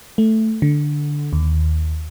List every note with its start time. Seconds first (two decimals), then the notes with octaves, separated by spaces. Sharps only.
0.18 A3
0.62 D3
1.33 D#2